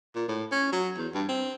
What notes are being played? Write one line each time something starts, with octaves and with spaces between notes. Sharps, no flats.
A#2
A2
C#4
F#3
E2
G2
C4